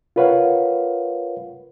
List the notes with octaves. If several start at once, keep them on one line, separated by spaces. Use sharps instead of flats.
F4 A#4 B4 C#5 F5 F#5